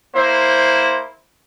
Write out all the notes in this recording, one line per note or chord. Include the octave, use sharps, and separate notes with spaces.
A#3 E4 C5